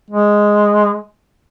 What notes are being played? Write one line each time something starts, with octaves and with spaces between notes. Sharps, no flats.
G#3